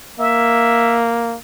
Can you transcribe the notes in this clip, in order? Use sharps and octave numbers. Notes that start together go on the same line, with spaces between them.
A#3 E5